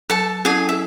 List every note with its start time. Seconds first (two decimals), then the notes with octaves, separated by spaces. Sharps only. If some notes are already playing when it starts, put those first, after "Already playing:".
0.10 F#3 A4 A5
0.45 C#4 E4 G#4 A4 D#5 G#5
0.69 E5